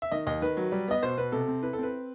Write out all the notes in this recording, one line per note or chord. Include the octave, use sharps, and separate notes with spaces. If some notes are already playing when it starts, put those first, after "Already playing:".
E5
D#3 D#5
D#2 D#5
D#3 B4
F#3
G3
B3 D#5
B2 C5
B2 B4
C3 A4
C4
E4 B4
A4
C4 B4